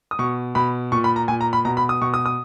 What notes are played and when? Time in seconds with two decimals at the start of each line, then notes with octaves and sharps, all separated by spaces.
0.11 D#6
0.19 B2 C#6
0.55 B2 B5
0.92 A#2 C#6
1.04 B5
1.16 A#5
1.28 A#2 G#5
1.41 A#5
1.53 B5
1.65 B2 A#5
1.77 B5
1.89 D#6
2.01 B2 C#6
2.14 D#6
2.26 D#6